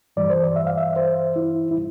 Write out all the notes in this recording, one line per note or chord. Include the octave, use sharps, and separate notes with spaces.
G2 E3 G3 D5
C5
D5
E5
F5
E5
C5
E4
E4